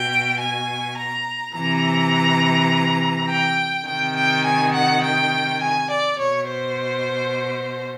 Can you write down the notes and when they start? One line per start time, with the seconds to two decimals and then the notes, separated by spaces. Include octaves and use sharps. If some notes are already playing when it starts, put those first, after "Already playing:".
Already playing: B2 G5
0.40 G#5
0.97 A#5
1.55 C3 E3 A#5
3.28 G5
3.87 C3 D#3 G5
4.16 G5
4.44 G#5
4.73 F#5
5.02 G5
5.60 G#5
5.89 D5
6.17 B2 C#5
6.46 C5